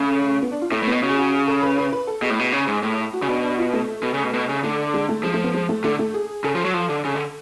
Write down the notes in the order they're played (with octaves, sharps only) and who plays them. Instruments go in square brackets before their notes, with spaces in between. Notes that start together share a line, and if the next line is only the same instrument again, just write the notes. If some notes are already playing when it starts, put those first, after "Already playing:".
Already playing: [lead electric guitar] C#3 [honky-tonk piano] A3
[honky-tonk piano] B3
D4
F4
[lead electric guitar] A2 [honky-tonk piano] A3
[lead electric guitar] A2
[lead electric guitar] B2 [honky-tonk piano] B3
[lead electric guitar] C#3 [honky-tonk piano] F#4
[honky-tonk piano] G#4
F#4
G#4
A4
B4
B4
B4
A4
[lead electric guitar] B2 [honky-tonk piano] G#4
[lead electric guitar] A2
B2
C#3
G#2
A2
[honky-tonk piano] F#4
[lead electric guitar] C#3
[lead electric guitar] B2 [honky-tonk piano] D4
[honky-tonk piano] D4
F4
A3
[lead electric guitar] B2
C#3
B2
B2
C#3
[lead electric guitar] D3 [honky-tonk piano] A3
[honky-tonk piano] G#3
A3
[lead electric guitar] F3 [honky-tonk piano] G#3
[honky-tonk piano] A3
B3
G#3
A3
[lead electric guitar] D3 [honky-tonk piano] A3
[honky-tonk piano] A3
G#4
[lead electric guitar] C#3 [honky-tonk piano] A4
[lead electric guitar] F3
F#3
F3
D3
C#3
D3